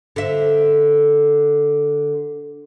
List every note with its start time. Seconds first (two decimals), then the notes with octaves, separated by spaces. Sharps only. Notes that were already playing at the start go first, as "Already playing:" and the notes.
0.16 D3 E5